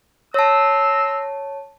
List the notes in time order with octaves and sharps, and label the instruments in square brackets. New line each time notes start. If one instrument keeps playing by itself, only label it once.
[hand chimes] C#5 A5 [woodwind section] A#5 C6 E6